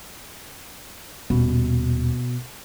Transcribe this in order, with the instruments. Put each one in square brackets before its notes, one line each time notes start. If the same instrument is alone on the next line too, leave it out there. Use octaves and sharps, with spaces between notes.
[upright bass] D#1 [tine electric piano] B2